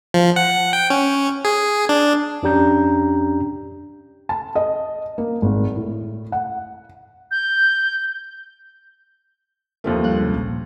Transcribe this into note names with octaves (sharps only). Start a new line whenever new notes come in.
F3
F#5
G5
C#4
G#4
D4
F2 C#4 D4 G4 A#5 G6
A5
D#5
A#3
G#1
A2
F#5
G6
D#2 F3 A3
G2 F4 F#6
C2 G#2 C#3
A#1